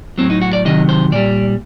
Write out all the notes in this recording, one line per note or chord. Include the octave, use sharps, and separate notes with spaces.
A2 F#3 C4
D#4
F#4
D5
C3 D#3 F#3 D#5
C5
A#2 G3 D5